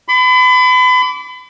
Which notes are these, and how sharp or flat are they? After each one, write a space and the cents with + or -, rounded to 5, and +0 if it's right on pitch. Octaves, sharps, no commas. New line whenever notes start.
B5 +35 D6 -30